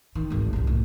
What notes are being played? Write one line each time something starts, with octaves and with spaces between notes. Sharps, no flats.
D#3
G#1 D2
C2 F#2
A2